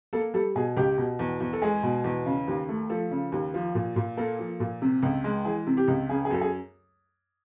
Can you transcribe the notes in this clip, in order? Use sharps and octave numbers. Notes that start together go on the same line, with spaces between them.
A#3 A4
G3 A4
B2 G#4
C#2 G4
B2
E2
E2
A4
G#3 G#4
B2
E2
C#3
D#2
A3
F3 A4
C#3
D#2
F3
A#2
A#2
A#3 A4
F3
A#2
C3
C#2
G#3
E3 G#4
C3
G4
C#2
C#3 G#4
G#4
F#2 A4
G#4